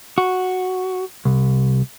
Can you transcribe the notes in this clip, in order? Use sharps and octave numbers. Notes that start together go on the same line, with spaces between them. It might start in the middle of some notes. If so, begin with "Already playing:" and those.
F#4
C2